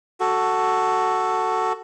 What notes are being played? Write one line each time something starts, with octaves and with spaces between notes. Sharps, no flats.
F#4 A4